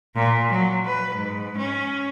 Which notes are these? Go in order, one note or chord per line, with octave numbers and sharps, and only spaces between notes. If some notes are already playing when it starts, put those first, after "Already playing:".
A#2
F#3
B4
G#2
C#4